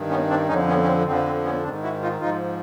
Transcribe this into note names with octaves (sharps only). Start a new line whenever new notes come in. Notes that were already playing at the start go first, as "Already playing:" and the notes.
Already playing: G2 D#3
B3 C#4
C4 D4
F2 D3 F3 C#4 D#4
B3 C#4
C#4
C4
F2 D3 F3 C4
C4
B3 C#4
G#2 D#3 C4 D4
E4 F#4
D#4 F4
G#2 F3 D#4 F4